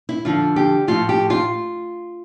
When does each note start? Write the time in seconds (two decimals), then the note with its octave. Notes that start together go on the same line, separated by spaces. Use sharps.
0.09 E4
0.25 F2 D3 F3 F4
0.56 G4
0.87 A2 F3 F4
1.09 G4
1.30 F4